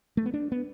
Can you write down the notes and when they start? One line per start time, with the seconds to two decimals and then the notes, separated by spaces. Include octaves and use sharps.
0.17 A3
0.26 B3
0.34 D4
0.52 B3